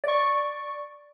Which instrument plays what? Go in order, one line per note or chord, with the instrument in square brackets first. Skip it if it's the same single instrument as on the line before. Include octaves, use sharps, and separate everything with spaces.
[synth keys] D5 C#6